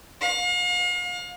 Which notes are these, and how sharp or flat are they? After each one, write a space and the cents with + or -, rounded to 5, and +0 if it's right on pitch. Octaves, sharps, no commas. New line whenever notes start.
F5 +40